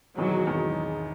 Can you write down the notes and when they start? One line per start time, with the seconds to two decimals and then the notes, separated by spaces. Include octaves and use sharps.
0.18 E1 E2 D#3 F#3 G#3
0.47 E1 E2 D#3 G#3